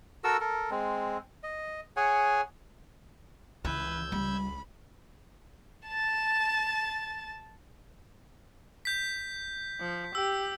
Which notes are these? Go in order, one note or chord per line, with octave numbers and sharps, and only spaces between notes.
F#4 A4 A#4 E6
A4 A#4
G#3 C4
D#5
G#4 C#5 F#5 G#5
C#2 E3 B4 E6 G6 G#6
G3 B5
A5 A6
G6 B6
F3
G4 E6